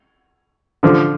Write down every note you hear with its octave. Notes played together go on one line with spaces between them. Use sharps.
D3 F3